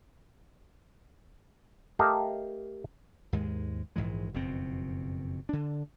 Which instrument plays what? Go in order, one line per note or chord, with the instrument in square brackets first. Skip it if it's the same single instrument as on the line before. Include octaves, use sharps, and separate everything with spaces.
[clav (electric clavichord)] A3 G4 A4 A#4 D#5 F5
[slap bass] D#2 G#2 G#3
A#1 G#2 E3 G#3
F#1 F2 B2 C4
D3 D4